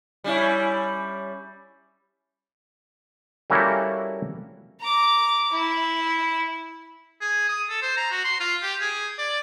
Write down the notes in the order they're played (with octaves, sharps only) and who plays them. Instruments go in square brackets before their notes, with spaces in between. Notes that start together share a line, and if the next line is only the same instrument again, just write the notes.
[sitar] G3 C#4 E4
[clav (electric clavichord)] G3 A#3 C#4 E4 F#4 A4
[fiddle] A#5 D6
E4
[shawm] G#4
D#6
A4
C5
A#5
F#4
C6
F4
G4
G#4
D5